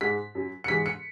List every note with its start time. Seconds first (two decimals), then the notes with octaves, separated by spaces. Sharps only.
0.01 G#2 G#3 B6
0.35 F#2 F#3
0.64 C#7
0.68 G#2 E3 G#3 B6
0.86 C#7